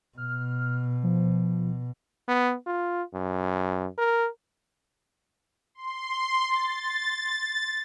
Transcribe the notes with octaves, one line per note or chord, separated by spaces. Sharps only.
B2 F6
F3
B3
F4
F#2
A#4
C6
A6